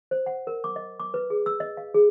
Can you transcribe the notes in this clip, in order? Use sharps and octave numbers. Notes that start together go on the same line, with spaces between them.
C5
F#5
A#4
D6
D#5
D6
B4
G#4
E6
D#5
F5
G#4